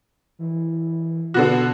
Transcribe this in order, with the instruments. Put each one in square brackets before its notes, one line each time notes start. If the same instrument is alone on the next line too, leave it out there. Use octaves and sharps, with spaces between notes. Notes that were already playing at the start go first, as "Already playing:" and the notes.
[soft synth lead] E3
[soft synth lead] B2 [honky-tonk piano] D3 B3 F#4